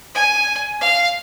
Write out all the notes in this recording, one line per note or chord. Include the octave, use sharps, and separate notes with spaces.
G#5
F5